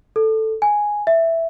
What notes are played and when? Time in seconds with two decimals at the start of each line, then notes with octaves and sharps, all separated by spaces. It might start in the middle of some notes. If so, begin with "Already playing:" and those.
0.16 A4
0.62 G#5
1.07 E5